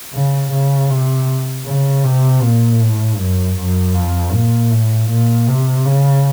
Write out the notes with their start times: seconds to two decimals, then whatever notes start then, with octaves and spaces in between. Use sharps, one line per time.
0.14 C#3
0.51 C#3
0.90 C3
1.65 C#3
2.04 C3
2.41 A#2
2.80 A2
3.18 F#2
3.57 F#2
3.94 F2
4.33 A#2
4.71 A2
5.09 A#2
5.47 C3
5.85 C#3